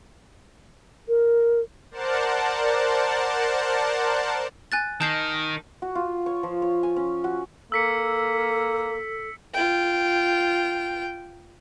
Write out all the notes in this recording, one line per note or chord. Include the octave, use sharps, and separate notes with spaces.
A#4
A#4 C5 D5 F#5 A5
G#5 F#6 A6
D#3 A5 G6 C7
F#4
F4
C#5
F3
C#5
G#5
C#4
F#4
A#3 A4 E6 B6 C#7
F4 G5